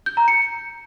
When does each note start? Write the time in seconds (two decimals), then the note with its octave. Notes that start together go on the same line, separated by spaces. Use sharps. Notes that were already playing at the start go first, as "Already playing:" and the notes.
0.06 G6
0.17 A#5
0.28 C#7